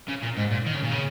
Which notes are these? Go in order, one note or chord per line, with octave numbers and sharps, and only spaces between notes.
C#3
A#2
G#2
A#2
D#3
C#3
A#2
C#3